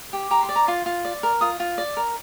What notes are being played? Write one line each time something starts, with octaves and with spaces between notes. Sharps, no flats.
G4
G4 A#5
C6
D5
A#5
F4 C6
F4
D5
A#4
F4 D#6
F4
D5
A#4